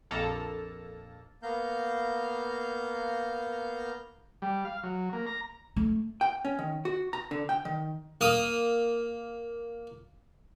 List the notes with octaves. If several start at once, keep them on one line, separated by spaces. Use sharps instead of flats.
A#1 F2 A#3 A4 A5 A#5
A#3 B3 F5 A#5 G6
G3
F5
F#3
A#3
A#5
A3
G5
C#4
D#3
F#4
A#5
D3
G5
D#3
A#3 D#6